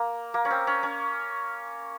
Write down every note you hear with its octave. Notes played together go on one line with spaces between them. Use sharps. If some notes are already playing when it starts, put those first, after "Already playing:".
Already playing: A#3
A#3
C#4
C4
C#4
C#4